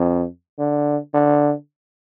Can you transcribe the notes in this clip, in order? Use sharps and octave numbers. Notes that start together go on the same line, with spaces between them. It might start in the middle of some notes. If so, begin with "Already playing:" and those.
Already playing: F2
D3
D3